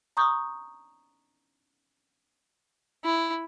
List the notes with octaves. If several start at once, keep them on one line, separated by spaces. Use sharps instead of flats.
A#5 C#6 D#6 G6
E4